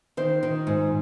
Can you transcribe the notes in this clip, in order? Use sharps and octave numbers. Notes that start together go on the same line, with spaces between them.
D#3 C5
D#3
G#2